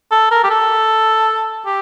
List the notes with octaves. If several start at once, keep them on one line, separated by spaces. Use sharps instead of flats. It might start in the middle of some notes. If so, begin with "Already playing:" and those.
A4
A#4
G4
A4
G4